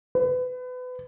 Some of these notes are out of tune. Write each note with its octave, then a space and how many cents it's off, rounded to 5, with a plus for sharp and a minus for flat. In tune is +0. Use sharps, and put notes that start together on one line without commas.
B4 +30